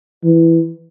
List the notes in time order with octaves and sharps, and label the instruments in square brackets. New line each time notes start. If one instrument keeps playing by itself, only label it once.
[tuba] E3